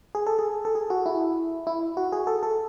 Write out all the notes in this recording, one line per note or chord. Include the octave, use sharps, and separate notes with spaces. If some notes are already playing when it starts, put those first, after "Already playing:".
G#4
A4
G#4
A4
G#4
F#4
E4
E4
F#4
G#4
A4
A4